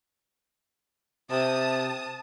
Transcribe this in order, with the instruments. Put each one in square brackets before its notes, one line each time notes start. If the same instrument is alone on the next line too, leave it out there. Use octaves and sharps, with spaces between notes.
[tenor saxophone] C3 [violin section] A5 D#6